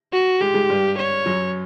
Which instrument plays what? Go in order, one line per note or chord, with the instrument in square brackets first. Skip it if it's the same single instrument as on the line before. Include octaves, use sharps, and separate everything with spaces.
[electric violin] F#4
[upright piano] G#2 G#3 [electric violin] G4
[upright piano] G#2 G#3
G2 G3
[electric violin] C#5
[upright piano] F#2 F#3